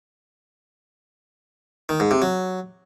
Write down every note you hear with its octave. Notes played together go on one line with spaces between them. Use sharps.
D#3
G#2
C3
F#3